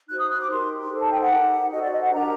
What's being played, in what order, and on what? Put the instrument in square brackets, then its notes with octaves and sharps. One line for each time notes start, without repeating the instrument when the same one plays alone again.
[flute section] D#4 F#4 C5 F#6
D#6
F#6
D6
D#4 G4 A#4 C6
D#4 A4 C5
A5
G5
F#5
D#4 G4 A#4
F#4 A4 C5 D#5
D5
D#5
F#5
D4 G4 A#4 A#5